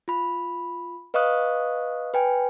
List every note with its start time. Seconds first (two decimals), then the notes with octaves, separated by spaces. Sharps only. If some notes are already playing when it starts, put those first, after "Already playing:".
0.08 F4 B5
1.14 B4 D#5 F5 C#6 D#6 F#6
2.14 B4 G5 G#5